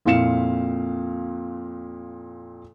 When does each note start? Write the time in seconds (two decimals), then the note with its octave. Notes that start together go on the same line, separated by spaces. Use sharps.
0.05 F2 A#2 E4 F5 C#7 E7